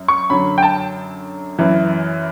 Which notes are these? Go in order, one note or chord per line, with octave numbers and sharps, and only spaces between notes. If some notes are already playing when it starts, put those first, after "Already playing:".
Already playing: F#2
C#6
F#2 D3 F#3 B5
G5
A5
F#2 E3